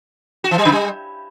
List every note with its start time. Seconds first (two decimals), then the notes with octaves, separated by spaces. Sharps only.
0.44 F#4
0.51 E3
0.58 G3
0.65 C#3
0.72 G3